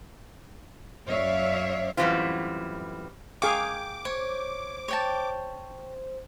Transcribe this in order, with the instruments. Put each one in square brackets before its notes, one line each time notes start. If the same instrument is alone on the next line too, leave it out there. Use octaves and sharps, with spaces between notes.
[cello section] F#2 C#5 D5 E5 F5
[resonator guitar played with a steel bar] F#2 A2 E3 G3 C4 F4
[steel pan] G#4 F5 C#6 [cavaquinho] G5 [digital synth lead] D6
[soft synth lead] C5 [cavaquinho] C#5
[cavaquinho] C#5 G5 A5